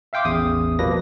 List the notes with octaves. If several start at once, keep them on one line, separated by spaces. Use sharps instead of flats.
E5 F5 G5 C6 D6
A1 E2 D#6
B2 F3 G3 A#3 B4 A#6